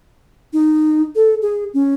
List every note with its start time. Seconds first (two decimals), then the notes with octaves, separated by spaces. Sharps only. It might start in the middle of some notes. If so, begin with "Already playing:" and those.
0.53 D#4
1.15 A4
1.42 G#4
1.74 C#4